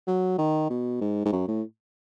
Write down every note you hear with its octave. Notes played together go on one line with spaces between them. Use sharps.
F#3
D#3
B2
G#2
G#2
F#2
A2